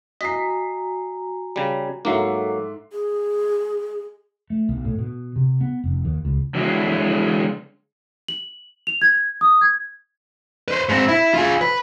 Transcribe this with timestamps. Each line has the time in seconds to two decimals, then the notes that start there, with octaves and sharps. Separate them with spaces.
0.21 F#4 D#5 G#5 A#5 B6 C7
1.56 C#3 G3
2.05 G#2 F#3 A#3 A4 E5 D6 C7
2.92 G#4
4.50 A3
4.69 B1
4.85 A2
4.99 B2
5.36 C3
5.61 B3
5.84 F1
6.05 D#2
6.25 C#2
6.55 D3 E3 F#3 G#3 F#4 G#4
8.28 F#7
8.87 F7
9.02 G#6
9.41 D#6
9.61 G#6
10.68 B4 C5
10.89 G#2 C4
11.08 E4
11.34 F4 G#4
11.61 B4